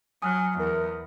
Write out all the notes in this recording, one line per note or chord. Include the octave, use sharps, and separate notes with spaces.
F#3 G#5 D#6 F6 F#6
E2 A#4